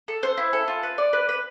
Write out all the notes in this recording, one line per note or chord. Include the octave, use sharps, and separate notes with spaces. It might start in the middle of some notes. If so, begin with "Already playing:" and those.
A4
C5
E4
A4
F4
B4
D5
B4
B4